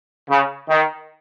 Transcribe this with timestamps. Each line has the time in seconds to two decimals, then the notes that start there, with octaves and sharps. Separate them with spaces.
0.29 C#3
0.69 D#3